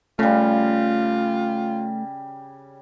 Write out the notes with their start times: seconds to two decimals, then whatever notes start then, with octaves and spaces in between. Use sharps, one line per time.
0.19 C#3 G3 A3 F4